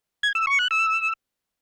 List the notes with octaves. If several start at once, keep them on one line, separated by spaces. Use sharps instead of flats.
G#6
E6
C#6
F#6
E6